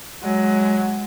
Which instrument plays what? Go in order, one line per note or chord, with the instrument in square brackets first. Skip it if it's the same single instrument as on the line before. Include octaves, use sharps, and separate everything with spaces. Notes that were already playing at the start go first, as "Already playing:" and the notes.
[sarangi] F#3 [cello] G#3